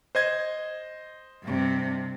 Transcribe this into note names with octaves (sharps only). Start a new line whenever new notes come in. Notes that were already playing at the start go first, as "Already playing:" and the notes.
C5 D#5 G#6
G2 C3